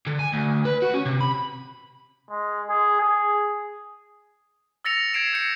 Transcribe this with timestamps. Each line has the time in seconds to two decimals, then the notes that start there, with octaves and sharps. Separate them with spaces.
0.06 D3
0.19 G#5
0.32 D2
0.65 B4
0.82 F#4
0.94 C#4
1.06 C3
1.21 B5
2.31 G#3
2.70 G#4
3.01 G#4
4.85 E6 A6 A#6 C#7 F7
5.14 G#6 C7 D7 E7
5.33 G6 C#7